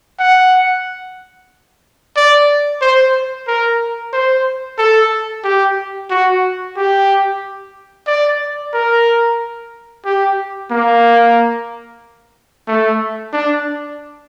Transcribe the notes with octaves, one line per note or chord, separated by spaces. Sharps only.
F#5
D5
C5
A#4
C5
A4
G4
F#4
G4
D5
A#4
G4
A#3
A3
D4